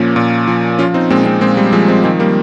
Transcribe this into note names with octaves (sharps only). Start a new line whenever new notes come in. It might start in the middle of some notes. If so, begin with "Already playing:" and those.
Already playing: A#2 F3 A#3 C#4
A#2
F3
F3 C#4 F4
C4 D#4
A#2 G#3 C4
G#3 C4
A#2 G#3 C4
G3
F3 G#3
G#3 C4
D#3 G#3 C4
G3 A#3